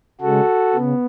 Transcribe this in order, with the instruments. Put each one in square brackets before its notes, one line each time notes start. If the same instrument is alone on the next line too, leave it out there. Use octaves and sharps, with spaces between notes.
[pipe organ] C#3 G#3 F#4 A4
C#3 B3